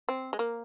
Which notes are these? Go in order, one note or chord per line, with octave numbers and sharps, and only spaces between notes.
C4
G#3
A#3